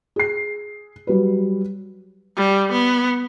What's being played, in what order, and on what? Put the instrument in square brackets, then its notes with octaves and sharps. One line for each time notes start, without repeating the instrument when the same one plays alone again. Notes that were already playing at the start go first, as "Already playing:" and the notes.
[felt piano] G#4 C7
F#3 G3 B4
[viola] G3
B3